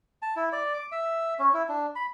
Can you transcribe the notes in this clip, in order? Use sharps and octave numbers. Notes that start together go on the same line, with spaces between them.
A5
E4
D5
D6
E5
C#4
E4
D4
B5